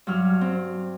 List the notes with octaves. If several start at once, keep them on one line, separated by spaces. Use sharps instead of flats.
G2 F#3 F6
C4